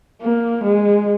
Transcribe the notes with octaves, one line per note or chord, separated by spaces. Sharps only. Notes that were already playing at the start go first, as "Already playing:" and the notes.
A#3
G#3